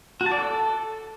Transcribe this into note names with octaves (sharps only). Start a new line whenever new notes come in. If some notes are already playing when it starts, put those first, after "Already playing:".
F#4
A5
D5
A4